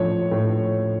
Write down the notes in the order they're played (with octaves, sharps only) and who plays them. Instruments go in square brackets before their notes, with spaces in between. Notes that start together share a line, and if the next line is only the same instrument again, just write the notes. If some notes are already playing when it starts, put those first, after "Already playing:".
Already playing: [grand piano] A2 F3 [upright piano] C#5
[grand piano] A2